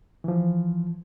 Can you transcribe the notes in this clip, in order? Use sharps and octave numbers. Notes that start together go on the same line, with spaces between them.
E3 F3